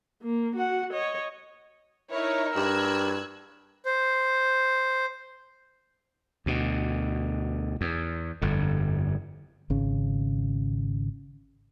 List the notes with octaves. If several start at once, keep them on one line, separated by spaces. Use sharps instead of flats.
A#3
F#4 F#5
C#5 D#5
D#4 E4 A#4 C#5
G2 E6 F#6 G#6
C5
D2 B2
E2
G1 F2 D3
G#1 C#3